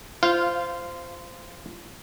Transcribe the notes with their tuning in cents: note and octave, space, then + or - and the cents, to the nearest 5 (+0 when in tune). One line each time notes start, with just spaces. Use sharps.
F4 -20 C5 -10 F5 +0